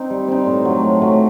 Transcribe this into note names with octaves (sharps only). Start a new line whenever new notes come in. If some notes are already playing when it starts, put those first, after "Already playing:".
Already playing: C4 D#4
G3
C4 D#4
A2
F#3 A3
A2
F#3 A3